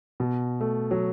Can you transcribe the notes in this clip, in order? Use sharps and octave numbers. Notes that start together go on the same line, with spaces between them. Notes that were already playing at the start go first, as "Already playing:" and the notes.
B2
A3
F#3